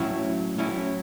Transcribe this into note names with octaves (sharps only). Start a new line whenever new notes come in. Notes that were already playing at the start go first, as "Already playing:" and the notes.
Already playing: A2 F#3 C#4 E4
A2 F#3 C#4 E4